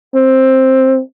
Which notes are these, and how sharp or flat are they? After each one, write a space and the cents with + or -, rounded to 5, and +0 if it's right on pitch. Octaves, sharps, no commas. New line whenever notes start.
C4 +10